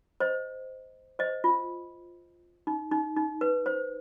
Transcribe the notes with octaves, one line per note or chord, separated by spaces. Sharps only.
C5 D#5
C5 D#5
F4
D#4
D#4
D#4
B4
C5